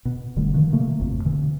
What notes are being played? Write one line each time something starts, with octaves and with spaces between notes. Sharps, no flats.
B2
F1 D3 G3 A3
B2 D3 D#3 F3
C3 A3 A#3
G#1 F2 C3
B2 D3 E3